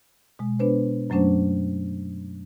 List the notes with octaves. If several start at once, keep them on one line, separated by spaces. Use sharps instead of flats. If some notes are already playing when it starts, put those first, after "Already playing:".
B2 G#3
B3 D4 B4 C5
F#2 F#3 A3 C#4 D4 C5